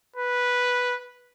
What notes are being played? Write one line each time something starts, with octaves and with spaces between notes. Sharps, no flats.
B4